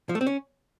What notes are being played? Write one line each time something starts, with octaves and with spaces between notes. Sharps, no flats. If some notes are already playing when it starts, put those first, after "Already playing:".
F3
A3
C4
C#4